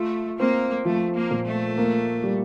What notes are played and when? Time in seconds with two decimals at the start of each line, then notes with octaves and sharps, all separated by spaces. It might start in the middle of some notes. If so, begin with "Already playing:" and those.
Already playing: A3 F4
0.39 A#3 C4
0.85 F3 A3
1.16 A#3
1.31 A#2
1.46 A3
1.78 A#3
2.24 G3